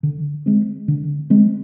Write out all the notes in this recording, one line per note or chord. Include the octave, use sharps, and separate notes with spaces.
D3
G#3 C4
D3
G#3 C4